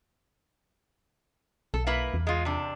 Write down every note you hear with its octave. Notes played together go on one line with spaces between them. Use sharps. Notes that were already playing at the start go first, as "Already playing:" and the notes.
B1 A4
A#3 E4 B4
E2
G#3 F4
C3 D4